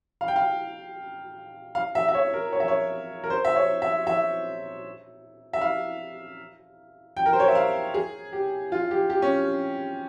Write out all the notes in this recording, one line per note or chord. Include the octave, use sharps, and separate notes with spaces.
F5
G5
F5
F5
E5
E5
C#5
A#4
C#5
E5
C#5
A#4
C5
E5
C#5
E5
E5
E5
F5
G5
A#4
C5
C#5
E5
F5
G#4
G4
F4
G4
G4
C#4